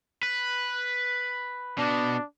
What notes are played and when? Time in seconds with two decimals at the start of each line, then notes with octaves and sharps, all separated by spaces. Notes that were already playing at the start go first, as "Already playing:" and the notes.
0.23 B4
1.78 B2 D4